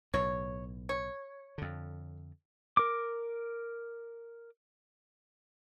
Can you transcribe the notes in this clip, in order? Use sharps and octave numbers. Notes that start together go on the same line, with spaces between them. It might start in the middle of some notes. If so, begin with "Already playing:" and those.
B1 A2 C#5
C#5
F2 D3
A#4 D6